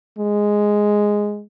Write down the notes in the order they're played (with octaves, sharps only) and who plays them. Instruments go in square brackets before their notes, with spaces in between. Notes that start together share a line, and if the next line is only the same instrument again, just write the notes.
[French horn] G#3